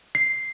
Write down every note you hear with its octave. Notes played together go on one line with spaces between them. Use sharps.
C7